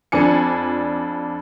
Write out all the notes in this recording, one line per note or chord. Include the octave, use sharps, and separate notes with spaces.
F2 F3 D4 G#5 C#7